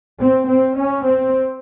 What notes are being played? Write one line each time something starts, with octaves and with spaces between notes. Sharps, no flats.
C4
C4
C#4
C4